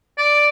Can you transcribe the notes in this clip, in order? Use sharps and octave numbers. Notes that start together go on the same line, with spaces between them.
D5